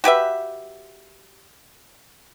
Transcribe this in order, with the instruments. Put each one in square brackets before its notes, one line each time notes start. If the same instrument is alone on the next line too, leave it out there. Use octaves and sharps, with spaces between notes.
[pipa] F#4 G4 B4 E5